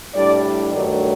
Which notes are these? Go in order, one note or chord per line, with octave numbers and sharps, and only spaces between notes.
A2 G3 D4 D5
G2 D#3 F#3 A3 D5